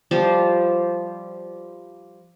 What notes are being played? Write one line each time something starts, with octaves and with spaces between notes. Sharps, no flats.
F3 G3 F4 C5